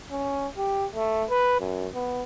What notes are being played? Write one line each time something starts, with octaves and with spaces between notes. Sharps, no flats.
C#4
G4
A3
B4
F#2
B3